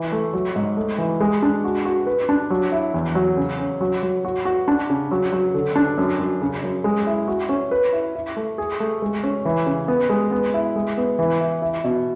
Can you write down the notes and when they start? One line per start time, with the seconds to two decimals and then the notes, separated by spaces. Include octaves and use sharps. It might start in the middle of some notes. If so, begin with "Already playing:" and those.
Already playing: E3
0.12 A3
0.33 F#3
0.56 G#2
0.77 A3
0.98 E3
1.20 G#3
1.43 D4
1.64 F#4
1.85 F#4
2.07 B4
2.29 D4
2.50 F#3
2.72 E4
2.94 E2
3.15 F#3
3.37 C#3
3.59 C#4
3.81 F#3
4.03 F#3
4.25 F#4
4.45 F#4
4.68 D4
4.90 C#3
5.11 F#3
5.32 F#3
5.54 D3
5.76 D4
5.98 F#2
6.20 F#2
6.42 C#3
6.63 F#2
6.84 G#3
7.07 E4
7.28 F#4
7.49 C#4
7.71 B4
7.93 E4
8.15 E4
8.37 A3
8.58 G#4
8.80 A3
9.02 G#3
9.23 C#4
9.45 E3
9.66 C#3
9.88 B3
10.10 G#3
10.31 B3
10.54 E4
10.76 G#3
10.98 B3
11.19 E3
11.41 E4
11.62 E4
11.84 B2